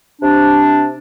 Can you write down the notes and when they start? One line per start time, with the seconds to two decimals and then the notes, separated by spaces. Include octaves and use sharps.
0.22 C3 D4